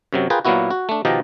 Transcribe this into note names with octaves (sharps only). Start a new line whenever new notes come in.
F#2 C3 F#3
F4 G#4 A#4 B4 G5
A#2 F#3 A#3 B3 E4 F#4
F#4
A3 D4
B2 D#3 F3 G4 A#4 D#5